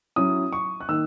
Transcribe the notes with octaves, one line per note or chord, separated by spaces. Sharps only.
F#3 C#4 E4 D#6
C#6
F#6
D#3 A#3 D#4 E6